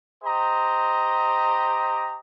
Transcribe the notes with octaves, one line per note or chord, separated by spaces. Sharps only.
G4 C5 D#5 A#5